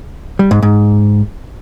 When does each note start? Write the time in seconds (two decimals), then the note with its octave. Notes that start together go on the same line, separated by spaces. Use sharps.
0.39 G3
0.51 G#2
0.63 G#2